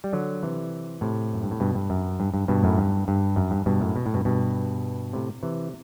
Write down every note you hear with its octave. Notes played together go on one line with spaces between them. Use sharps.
G3
D3 F#3
C3 E3
A2 C3
F#2
G2
A2
G2 B2
G2
F#2
G2
G2
G2 B2
F#2 A2
G2
G2
F#2
G2
G2 B2
F#2 A2
B2
A2
G2 B2
G2 B2
A2 C3
C3 E3